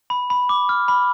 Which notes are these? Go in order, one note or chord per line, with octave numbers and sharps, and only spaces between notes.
B5
B5
D6
F6
B5